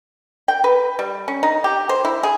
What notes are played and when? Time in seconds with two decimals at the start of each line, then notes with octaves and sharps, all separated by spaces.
0.48 G5
0.64 B4
0.99 G3
1.28 C#4
1.43 D#4
1.64 G4
1.89 C5
2.05 E4
2.23 G#4